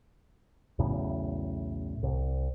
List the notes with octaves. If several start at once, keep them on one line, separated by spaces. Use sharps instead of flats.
B1 E2 A2 C#3
C2